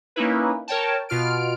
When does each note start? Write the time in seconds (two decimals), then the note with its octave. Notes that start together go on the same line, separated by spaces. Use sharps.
0.16 A#3 C#4 D#4 E4 B4
0.68 A#4 C#5 G5 A5
1.09 B2 F4 F6 D7